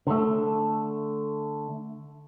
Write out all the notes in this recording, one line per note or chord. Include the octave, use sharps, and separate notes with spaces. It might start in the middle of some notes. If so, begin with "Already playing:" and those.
D3 A3